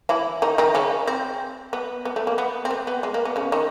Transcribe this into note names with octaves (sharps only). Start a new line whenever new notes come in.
E3 E4
D#3 D#4
D#3 D#4
C#3 C#4
C4
B3
B3
A3
A#3
B3
C4
B3
B3
G#3
A#3
B3
C#3 C#4
D#3 D#4